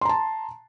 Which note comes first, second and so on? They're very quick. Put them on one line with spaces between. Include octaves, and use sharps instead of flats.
C6 A#5 A5